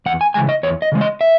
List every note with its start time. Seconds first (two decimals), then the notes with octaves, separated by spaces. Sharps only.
0.06 E2 F#5
0.21 G#5
0.34 C#3 E3 G#3 G#5
0.49 D#5
0.63 E2 C#5
0.82 D#5
0.92 C#3 E3 G#3
1.01 D#5
1.21 E5